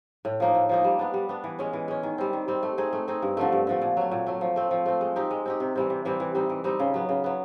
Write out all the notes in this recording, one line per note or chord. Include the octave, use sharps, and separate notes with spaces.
A2
F3 A#3 D#4
A2
F3 A#3 D#4
G3
B3 D4
G3
B3 D4
E3
G#3 C#4
E3
G#3 C#4
D#3
G3 C4
D#3
G3 C4
A3
C4 D#4 G#4
A3
C4 D#4 G#4
G2
D3 F3 A3
G2
D3 F3 A3
A#2
F#3 A3
A#2
F#3 A3
F3
A3 C4
F3
A3 C4
G#3
C4 D#4 G4
G#3
C4 D#4 G4
C3
E3 G3 C4
C3
E3 G3 C4
E3
G3 C4 D#4
E3
G3 C4 D#4
C#3
F#3 B3
C#3
F#3 B3